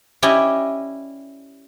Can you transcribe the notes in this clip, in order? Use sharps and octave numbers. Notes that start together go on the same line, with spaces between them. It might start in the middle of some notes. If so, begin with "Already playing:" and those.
C#4 E4 G4 D5 D#5